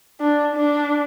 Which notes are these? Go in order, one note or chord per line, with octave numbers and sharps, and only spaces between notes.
D4
D4